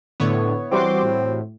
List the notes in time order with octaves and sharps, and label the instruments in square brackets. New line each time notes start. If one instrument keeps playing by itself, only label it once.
[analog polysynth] A2 D3 [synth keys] B3 E4 C#5
[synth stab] E3 G3 F#4 [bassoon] C4 [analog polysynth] C6 D6
[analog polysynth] A2